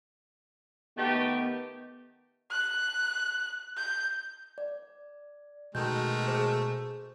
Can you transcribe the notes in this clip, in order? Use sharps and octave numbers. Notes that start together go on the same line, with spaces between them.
D#3 A3 B3 G4
F#6
G6
D5
B2 D#3 G#3 A3 G6
G#4 C5